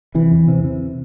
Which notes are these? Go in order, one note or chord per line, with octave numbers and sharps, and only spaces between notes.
C3 E3
E2
C3
C3